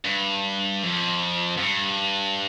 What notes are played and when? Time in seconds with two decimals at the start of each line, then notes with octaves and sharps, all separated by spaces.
0.05 G2
0.83 F2
1.57 F2
1.63 G2